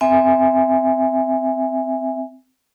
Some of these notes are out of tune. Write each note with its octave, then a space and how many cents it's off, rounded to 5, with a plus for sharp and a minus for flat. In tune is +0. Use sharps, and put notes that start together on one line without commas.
C4 -15 E5 +0 G#5 -15